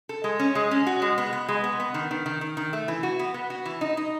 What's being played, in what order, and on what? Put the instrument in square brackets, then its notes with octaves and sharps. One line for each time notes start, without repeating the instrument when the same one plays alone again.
[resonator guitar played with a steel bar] A4
G#3
C#4
G#3
C#4
F#4
G#3
B3
B3
G#3
B3
B3
D#3
D#3
D#3
D#3
D#3
A3
E3
F#4
B3
B3
F#4
E3
D#4
D#4